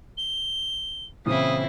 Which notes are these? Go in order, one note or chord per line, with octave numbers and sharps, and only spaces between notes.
G7
A#2 C#3 E3 C4 E4 D#6